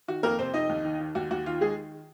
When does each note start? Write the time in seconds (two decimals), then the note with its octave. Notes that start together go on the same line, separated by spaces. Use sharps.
0.08 D#3 F#4
0.23 F2 A#3 A#4
0.39 C3 C4 C5
0.54 F2 D#4 D#5
0.69 D#2
0.84 D#3
1.00 D#3
1.15 D#2 F#4
1.31 D#2 F#4
1.46 D#3 F4
1.61 D#3 G#3 G#4